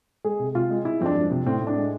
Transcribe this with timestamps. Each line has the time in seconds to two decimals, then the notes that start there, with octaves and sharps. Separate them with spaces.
0.24 G#3 G#4
0.39 C3
0.55 C3 F4
0.70 G#3
0.85 G#3 E4
1.01 F2 C4
1.06 D4
1.16 F2
1.31 C3
1.46 A2 C4
1.61 A2
1.67 D4
1.76 G#3